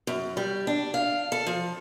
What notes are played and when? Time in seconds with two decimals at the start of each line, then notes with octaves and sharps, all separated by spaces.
0.07 F#2
0.37 G3
0.67 D4
0.94 F5
1.32 A4
1.47 F3